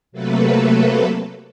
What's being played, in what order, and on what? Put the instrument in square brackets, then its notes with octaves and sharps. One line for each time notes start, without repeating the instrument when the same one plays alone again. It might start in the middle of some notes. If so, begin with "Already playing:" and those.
[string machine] C3 F#3 A3 A#3 A4 B4